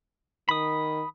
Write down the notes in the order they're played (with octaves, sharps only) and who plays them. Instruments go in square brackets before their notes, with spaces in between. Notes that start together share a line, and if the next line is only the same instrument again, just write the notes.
[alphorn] D#3 [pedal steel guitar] B5 D#6